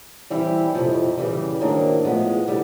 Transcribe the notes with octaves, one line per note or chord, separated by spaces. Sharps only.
E3 G3 C4 E4 G4
F2 C3 F3
C#3 E3 G3
G#2 D#3 F#3 A#3 D4
A2 F3 G#3 B3
D3 G3